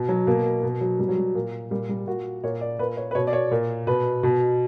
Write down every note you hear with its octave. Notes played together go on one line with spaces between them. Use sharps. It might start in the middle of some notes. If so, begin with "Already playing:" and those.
Already playing: B2
F#3
B2 A#3
B2
F#3
B2 G3
F#3
G3
A#2
A#2 G3
G3
A#2 F#4
A#2 C#5
D5
A#2 B4
C#5
B4
B2 C#5
D5
C#5
A#2
B2 B4
B2